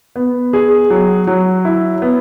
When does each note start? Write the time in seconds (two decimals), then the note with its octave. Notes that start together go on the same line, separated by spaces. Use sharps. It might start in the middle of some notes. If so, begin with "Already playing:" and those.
0.16 B3
0.53 G#4
0.90 F#3
1.27 F#3
1.65 E4
2.02 B3